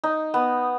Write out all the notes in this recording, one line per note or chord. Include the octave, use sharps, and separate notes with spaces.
D#4
B3